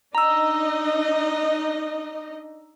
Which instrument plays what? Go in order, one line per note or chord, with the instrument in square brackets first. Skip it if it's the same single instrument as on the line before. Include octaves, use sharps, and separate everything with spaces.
[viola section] D4 D#4 D#5 [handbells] A#5 E6